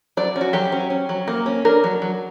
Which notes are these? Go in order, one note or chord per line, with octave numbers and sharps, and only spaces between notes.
F#3 D5
C#4
F#4
F#3 G4
C#4
C#4
F#3
A#3
C#4
D4 A#4
F#3
F#3